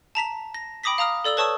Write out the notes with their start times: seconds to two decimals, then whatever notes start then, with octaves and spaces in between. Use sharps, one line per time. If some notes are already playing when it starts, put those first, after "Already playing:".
0.15 A5 A#5 B6 F7
0.54 A#6
0.83 G5 B5 D6 D#6 A#6 B6
0.98 F5 A#5 D#6 F6
1.24 A4 D5 E6 F#7 G7
1.37 B4 C#5 A5 C#6 D#6 E6